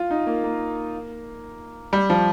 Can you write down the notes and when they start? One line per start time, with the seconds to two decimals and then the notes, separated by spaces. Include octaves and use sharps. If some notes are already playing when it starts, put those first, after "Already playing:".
Already playing: F4
0.11 D#4
0.27 A#3
0.44 A#3
1.93 G3
2.10 F3